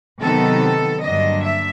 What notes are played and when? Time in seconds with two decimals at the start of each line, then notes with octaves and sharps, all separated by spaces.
0.21 C3 D#3 F#3 B3 D#4 A4
1.01 G2 D3 F#3 A#3 D4 D#5
1.41 E5